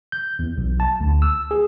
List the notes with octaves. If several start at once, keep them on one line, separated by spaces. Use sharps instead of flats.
G6
E2
B1
A5
D2
E6
G#4